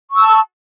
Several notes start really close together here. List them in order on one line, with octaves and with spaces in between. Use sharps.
C#6 E6 A5